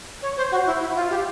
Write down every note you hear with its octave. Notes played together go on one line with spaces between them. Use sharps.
C#5
C5
F#4
E4
E4
F4
G4